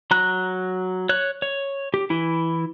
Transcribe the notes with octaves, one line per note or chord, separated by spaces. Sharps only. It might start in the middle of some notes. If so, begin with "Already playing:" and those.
F#3 A#5 F#6
C#5 F#6
C#5
G4
E3 E4